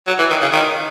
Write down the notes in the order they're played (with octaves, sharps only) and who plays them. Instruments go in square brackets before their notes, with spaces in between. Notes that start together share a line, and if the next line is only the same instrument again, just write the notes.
[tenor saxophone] F#3
E3
D#3
C#3
D#3